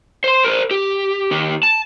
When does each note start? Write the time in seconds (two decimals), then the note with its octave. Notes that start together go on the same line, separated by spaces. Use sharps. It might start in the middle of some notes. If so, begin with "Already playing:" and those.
0.24 C5 C6
0.44 A#4 C5
0.71 G4
1.31 D#2 G4
1.63 A5